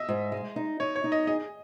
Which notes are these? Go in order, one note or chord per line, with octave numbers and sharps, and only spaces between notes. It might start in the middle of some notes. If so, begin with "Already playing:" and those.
Already playing: D#5 E5
G#2
G#3
D#4
D#4 C#5
C#5
D#4
D#5
G#4 D#5